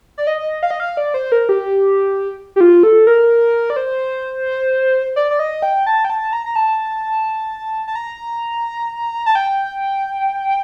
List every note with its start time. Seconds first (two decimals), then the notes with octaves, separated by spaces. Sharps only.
0.18 D5
0.27 D#5
0.63 F5
0.71 D#5
0.80 F5
0.97 D5
1.14 C5
1.32 A#4
1.49 G4
2.56 G4
2.61 F4
2.83 A4
3.07 A#4
3.70 D5
3.76 C5
5.16 D5
5.31 D5
5.39 D#5
5.62 G5
5.87 A5
6.05 G5
6.10 A5
6.33 A#5
6.46 A#5
6.56 A5
7.88 A5
7.95 A#5
9.26 A5
9.35 G5